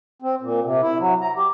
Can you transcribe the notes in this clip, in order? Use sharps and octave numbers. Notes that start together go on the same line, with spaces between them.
C4
A#2
C3
E4
F#3
A#5
G4